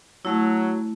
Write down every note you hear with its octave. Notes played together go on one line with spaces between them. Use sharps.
F#3 A3 E4